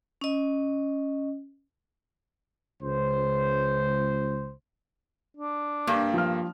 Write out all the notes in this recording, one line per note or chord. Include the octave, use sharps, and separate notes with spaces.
C#4 D#5
C#2 C5
D4
G2 G3 A#3
F3 F6